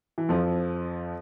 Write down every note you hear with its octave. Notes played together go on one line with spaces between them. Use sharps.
E3
F2 F3